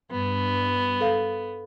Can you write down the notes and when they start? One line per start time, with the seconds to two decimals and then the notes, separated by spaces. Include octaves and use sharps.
0.11 G2 B3
1.01 A4 F5